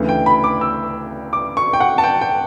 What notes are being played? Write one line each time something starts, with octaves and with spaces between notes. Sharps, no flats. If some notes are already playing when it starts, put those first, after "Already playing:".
Already playing: D2 C#3 E3
G5
B5
D6
E6
D6
C#6
G5
F#5
A5
G5
G5